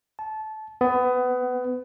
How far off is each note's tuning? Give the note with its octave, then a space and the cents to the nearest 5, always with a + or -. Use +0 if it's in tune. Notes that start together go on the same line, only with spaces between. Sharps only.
A5 -20
B3 +25